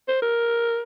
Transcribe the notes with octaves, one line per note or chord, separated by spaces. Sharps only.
C5
A#4